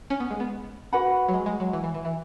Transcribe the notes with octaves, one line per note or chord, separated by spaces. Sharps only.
C#4
B3
G#3
B3
F#4 B4 F#5 B5
F#3
G#3
G#3
F#3
E3
E3
E3
E3